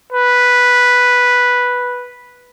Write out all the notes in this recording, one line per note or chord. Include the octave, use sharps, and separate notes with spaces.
B4